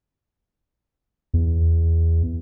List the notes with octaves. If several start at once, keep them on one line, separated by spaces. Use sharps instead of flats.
E2